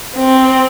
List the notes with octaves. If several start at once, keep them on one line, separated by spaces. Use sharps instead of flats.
C4